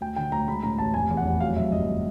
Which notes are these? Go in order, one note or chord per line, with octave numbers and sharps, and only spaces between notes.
D2 G5
D3 G5
D2 A#5
G#3 B5
A2 A#5
A1 A5
F1 G#5
E2
F#5
F1
F#3 F5
F#2 E5
G1 D#5